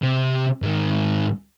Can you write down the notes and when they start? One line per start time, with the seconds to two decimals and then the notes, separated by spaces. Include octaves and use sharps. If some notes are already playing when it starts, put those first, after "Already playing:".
0.03 C3
0.62 G#2 D#3